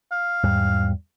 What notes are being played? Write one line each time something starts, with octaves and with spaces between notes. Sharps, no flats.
F5
E2 G#2 G3